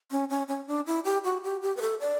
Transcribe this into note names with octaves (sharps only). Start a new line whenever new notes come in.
C#4
C#4
C#4
D4
E4
G4
F#4
G4
G4
B4
A4
D5